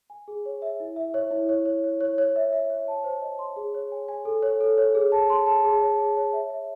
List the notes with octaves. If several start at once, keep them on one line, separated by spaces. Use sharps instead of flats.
G#5
G#4
C#5
E5
E4
E5
C#5
E4
C#5
C#5
C#5
C#5
C#5
E5
E5
C#5
A5
C5
D#5
C6
G#4
C#5
G#5
G#5
A4
C#5
A4
C#5
G#4
A5
C6
A5
G#4
C#5
G#4
C#5
E5
E5